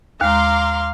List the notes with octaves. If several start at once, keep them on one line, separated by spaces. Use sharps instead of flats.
D#2 G#3 F5 A#5 C6 D6